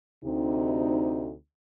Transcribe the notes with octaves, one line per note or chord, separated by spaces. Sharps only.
D2 C3 D#4